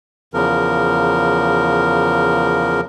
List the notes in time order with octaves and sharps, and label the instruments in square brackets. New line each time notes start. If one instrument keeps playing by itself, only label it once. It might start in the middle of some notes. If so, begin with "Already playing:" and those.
[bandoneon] E2 C#3 F3 A#4